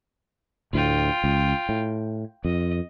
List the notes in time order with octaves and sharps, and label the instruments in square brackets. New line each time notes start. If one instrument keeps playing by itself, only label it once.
[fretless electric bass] D2 A2 [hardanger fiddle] F4 G5
[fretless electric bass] C#2
A2
[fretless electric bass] F2 [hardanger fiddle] D#5